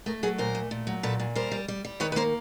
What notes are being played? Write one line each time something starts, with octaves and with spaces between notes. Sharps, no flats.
A3 G#4 A#4
F#3 G#4 A#4
A#2 A#4 C5
A3
A#2
F#3
A#2 A4 B4
A#2
G3 A#4 C5
G3
G3
G3
D#3 B4 C#5
B4
A#3 A#4 C5